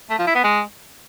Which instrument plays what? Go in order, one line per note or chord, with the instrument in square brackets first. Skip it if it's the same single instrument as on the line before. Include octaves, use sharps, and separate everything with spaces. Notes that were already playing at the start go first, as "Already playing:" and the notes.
[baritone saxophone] A3
F3
E4
B3
G#3